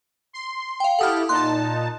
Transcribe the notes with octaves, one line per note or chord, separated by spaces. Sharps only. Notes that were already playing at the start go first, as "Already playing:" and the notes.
C6
F5 G5
E4 G4 A4 F#5 D#6 F6
A#2 D#4 A5 C6 F#6